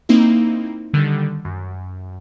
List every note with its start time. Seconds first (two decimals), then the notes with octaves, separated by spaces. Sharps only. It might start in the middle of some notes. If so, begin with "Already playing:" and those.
0.09 A#3 C4 D#4 E4
0.94 D3 D#3 G3
1.45 F#2